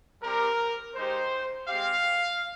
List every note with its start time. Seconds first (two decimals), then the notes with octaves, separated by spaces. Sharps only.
0.22 G3 C4 G4 A#4
0.95 G#3 D#4 G4 C5
1.67 G#3 C4 G4 F5